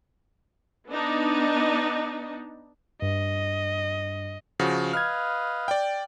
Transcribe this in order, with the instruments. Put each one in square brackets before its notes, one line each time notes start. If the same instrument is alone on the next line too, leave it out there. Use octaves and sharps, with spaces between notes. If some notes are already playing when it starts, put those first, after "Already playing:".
[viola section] B3 D4 D#4
[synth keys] G2 [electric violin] D#5
[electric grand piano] C#3 F3 F#4
[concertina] B4 D#5 F5 [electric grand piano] F6 G#6
[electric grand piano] D5 G5